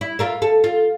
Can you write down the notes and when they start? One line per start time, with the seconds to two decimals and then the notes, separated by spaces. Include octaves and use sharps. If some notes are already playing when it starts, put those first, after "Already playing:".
0.01 E4
0.19 F4 A#4 E5
0.42 A4
0.64 F4